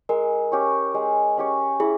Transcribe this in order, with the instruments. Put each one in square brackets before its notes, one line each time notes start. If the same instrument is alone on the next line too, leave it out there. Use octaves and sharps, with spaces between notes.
[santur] G#3 [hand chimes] A#4
[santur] C#4 G4 C#5
G#3
C#4 G4 C#5
[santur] E4 [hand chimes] G#4